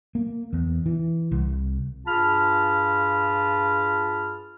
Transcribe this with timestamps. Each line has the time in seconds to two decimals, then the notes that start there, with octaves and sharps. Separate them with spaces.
0.15 A#3
0.53 E2
0.86 E3
1.32 C2
2.06 G2 F4 G#4 A5 B5 F6